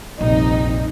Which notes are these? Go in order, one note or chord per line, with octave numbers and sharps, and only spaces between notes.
F1 A#1 G3 C4 D#4